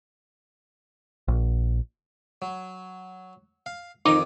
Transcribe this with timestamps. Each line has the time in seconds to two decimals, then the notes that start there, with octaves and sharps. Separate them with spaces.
1.28 A#1
2.42 F#3
3.66 F5
4.06 F2 D#3 D#4 D6 D#6